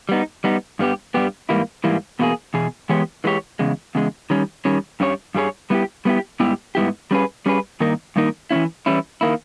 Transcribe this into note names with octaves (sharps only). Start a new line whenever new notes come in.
G3 B3 D#4
G3 B3 D#4
G2 G3 B3 G4
G2 G3 B3 G4
G#2 E3 G3 A#3 E4
G#2 E3 G3 A#3 E4
E2 B2 A#3 E4 G#4
E2 B2 G#4
E3 G#3 B3 G4 C#5
E3 G#3 B3 G4 C#5
E2 C#3 G#3
E2 C#3 G#3
D#3 G3 C#4
D#3 G3 C#4
G2 G3 C#4 G#4 C#5
G2 G3 C#4 G#4 C#5
G3 B3 E4 G4
G3 B3 E4 G4
G#2 G3 B3 E4 G4
G#2 G3 B3 E4 G4
G3 C#4 G#4 B4
G3 C#4 G#4 B4
G2 D#3 A#3 D#4 A#4
G2 D#3 A#3 D#4 A#4
E3 G3 C#4 E4
E3 G3 C#4 E4
D#3 A#3 E4